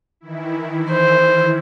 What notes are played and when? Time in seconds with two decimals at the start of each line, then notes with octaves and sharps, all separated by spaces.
0.21 D#3 E3 E4
0.91 C5